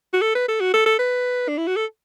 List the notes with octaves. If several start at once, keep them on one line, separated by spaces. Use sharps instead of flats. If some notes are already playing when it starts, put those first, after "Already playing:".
F#4
A4
B4
A4
F#4
A4
A4
B4
D4
E4
F#4
A4